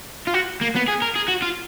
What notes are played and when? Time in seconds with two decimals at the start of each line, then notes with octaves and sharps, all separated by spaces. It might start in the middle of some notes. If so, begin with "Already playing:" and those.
0.27 F4
0.34 F#4
0.61 A#3
0.75 B3
0.88 G#4
1.02 A#4
1.16 G#4
1.28 F#4
1.42 F4